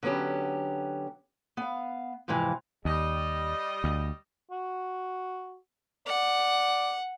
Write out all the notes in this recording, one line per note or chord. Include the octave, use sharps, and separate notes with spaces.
D3 F#3 B3 C#4 G4
B3 F5
F2 G#2 C3 E3 F3
D#2 G3 D#5
D2
F#4
D5 F#5